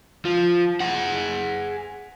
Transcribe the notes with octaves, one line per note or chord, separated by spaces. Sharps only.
F3
G#4 F#5